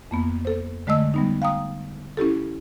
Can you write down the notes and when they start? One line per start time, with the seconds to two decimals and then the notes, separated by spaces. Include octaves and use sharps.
0.11 F2 A#3 B3
0.45 A4 C5
0.87 D3 G#3 A3 D#5 E6
1.14 G3 B3 D#4
1.42 F5 G5 A#5 D#6
2.17 C#4 E4 G4 A4